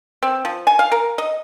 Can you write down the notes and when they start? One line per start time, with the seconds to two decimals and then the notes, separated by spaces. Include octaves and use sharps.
0.23 C4
0.45 F3
0.67 G#5
0.79 F5
0.92 A#4
1.18 D#5